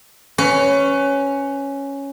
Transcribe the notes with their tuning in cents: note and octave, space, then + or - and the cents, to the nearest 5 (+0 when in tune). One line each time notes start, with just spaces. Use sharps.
C#4 +0 B4 +25